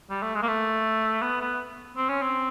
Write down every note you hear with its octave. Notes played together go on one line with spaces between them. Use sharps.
G3
A3
G#3
A#3
A3
B3
B3
C4
C#4
C4